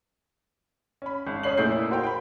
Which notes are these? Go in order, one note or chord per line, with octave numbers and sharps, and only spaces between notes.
C#4 B5
G#1
F2 C#4 C#5 C7 F#7
F2 A#2 A3 E4 G6 C7
A#3 F#4 C5 F5 G5
G5 B5